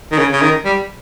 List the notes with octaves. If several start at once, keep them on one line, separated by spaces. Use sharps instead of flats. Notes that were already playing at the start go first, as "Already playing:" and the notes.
D#3
C#3
C#3
D#3
G3